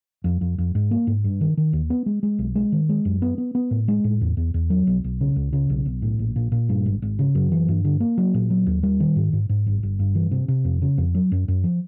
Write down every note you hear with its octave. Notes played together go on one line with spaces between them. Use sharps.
F2
F2
F2
G#2
A#3
G#2
G2
D#3
D#3
D#2
B3
G#3
G#3
B1
G#3
D#3
G#3
F#2
B3
B3
B3
A2
G#3
A2
E2
E2
E2
F#3
B1
B1
C#3
C#2
C#3
B1
B1
A2
A#1
A#2
A#2
G2
G#1
G#1
C#3
F#2
E3
G2
D3
A#3
F#3
A#2
F#3
D#2
G3
D#3
G#2
G#2
G#2
G1
G1
G2
E3
C3
C3
F2
C#3
F2
F#3
F#2
F#2
F3